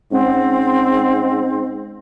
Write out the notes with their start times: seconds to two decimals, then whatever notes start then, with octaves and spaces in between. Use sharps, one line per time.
0.12 G#2 C4 C#4 F#5